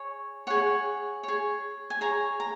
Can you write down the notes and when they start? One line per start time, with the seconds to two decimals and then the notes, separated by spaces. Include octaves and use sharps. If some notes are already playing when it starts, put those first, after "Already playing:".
Already playing: G#4 C#5
0.47 G#4 C#5 F#5
1.23 G#4 C#5
1.90 G#5
2.01 G#4 C#5 A#5
2.40 A#5